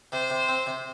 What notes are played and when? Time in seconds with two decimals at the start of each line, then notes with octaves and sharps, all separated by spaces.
0.12 C3 C5
0.30 C3
0.49 C4
0.67 C3